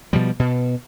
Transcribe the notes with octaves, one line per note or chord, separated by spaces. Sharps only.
B2 F3 G3
B2